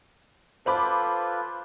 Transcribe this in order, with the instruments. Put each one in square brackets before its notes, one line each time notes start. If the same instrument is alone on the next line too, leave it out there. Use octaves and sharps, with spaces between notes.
[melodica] F4 A4 B4 [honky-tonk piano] C5 B5 D6